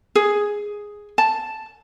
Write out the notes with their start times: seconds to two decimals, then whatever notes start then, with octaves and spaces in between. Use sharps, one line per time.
0.15 G#4
1.18 A5